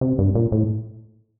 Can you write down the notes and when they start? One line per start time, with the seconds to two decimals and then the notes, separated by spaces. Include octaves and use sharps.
0.01 C3
0.18 G2
0.35 A#2
0.52 A2